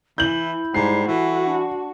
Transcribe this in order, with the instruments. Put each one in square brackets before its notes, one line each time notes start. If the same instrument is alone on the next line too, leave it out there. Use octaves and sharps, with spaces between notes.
[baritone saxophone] E3 [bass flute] E4 [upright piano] G6 F#7
[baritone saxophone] G#2 [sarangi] G3 [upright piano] C7
[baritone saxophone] E3 [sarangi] F#4 [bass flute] A4
[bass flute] D4